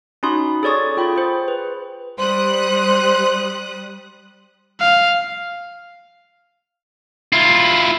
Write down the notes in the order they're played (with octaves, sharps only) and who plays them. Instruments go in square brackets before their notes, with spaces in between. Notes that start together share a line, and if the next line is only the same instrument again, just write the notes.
[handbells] C#4 D#4 F#4 B5 C6 D#6
G#4 A4 C#5 D5 C#6 D#6
F4 G5 B5
G#4 C5
B4
[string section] G3 D#6 F#6 [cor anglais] C5
[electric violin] F5
[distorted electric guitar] E4 F4